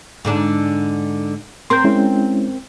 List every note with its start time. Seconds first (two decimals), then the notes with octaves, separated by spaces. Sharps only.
0.25 G#2 D3 D4
1.70 C4 A#4 C5 C6 G6
1.84 G#3 C#4 E4